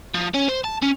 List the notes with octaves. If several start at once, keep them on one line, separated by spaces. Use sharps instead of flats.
F3
C#4
C5
A5
C#4